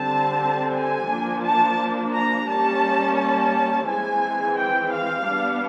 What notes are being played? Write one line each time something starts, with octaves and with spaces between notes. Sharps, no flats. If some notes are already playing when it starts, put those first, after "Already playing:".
Already playing: D3 G3 C4 A5
G#5
F3 A#3 D4
A5
A#5
G3 A#3 C#4 A5
A5
E3 G#3 C4 G#5
G5
F5
G3 B3 D4